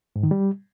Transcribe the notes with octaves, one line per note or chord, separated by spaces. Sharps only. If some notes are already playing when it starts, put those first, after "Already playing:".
G#2
D#3
G3